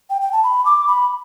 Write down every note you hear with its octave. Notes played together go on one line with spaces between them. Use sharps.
G5
G5
A5
B5
D6
B5